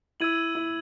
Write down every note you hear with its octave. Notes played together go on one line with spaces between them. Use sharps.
E4 E6 G#6 D#7 F#7
E4